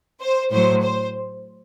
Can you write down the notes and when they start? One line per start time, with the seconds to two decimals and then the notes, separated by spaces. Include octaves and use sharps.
0.21 C5
0.51 A2 F#3 C5
0.82 C5